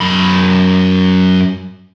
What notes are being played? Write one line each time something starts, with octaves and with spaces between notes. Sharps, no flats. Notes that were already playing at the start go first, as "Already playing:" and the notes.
F#2 B5